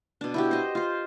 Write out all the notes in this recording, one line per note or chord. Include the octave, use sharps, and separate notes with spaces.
B2 D4
E4 F#4 G4
C5 D#5
F4 C5